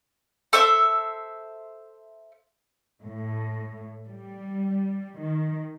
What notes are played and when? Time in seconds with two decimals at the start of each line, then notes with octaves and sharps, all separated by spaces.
0.53 A4 C5 E5 E6
3.05 A2
4.08 G3
5.21 D#3